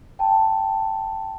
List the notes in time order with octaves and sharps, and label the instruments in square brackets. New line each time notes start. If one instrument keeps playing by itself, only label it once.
[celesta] G5 A5